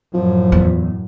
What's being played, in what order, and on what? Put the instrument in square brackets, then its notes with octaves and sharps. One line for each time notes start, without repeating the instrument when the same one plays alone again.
[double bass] F#2 A2 [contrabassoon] F3
[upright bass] E2